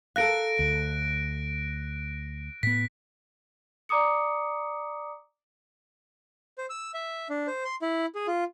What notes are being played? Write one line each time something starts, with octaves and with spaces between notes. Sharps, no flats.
A4 A#4 F5 F#6 A#6 D7
D2
A2 B3 B6
D5 A#5 D6 D#6 C#7
C5
E6
E5
D4
C5
C6
E4
G#4
F4